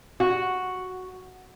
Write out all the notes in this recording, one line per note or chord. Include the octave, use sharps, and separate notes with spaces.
F#4